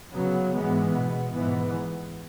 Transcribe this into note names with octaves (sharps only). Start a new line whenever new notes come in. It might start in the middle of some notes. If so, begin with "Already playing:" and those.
C#3 F#3 B3
G#2 E3 G#3 B3
B2 B3
G#2 E3 B3